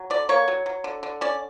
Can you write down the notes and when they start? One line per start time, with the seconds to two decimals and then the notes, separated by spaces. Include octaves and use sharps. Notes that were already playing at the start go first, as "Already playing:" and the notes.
Already playing: F#3
0.10 D3 D5
0.29 A#3 C#5
0.48 F#3
0.66 F#3
0.84 D3
1.03 D3
1.21 C#4 D5